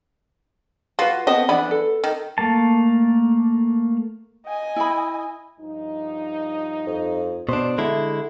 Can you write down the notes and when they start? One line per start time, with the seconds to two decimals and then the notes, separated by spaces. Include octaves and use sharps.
0.99 F4 F#4 B4
1.27 B3 C4 D#5 A5
1.49 E3 B3 D4 B5
1.71 A4
2.04 D#3
2.38 A3 A#3 A5
4.47 D#5 G#5
4.76 E4 B5
5.59 G2 F3 D#4
6.86 F2
7.49 B2 D4 C5
7.78 D3 G#3 A3 E4